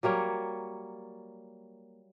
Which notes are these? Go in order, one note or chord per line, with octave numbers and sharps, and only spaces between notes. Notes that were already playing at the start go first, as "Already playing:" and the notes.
F#3 G3 A#3 C#5